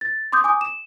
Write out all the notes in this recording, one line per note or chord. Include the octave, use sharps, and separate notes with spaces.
A6
C6 D6 D#6 G6
G#5 D6 D#6
E7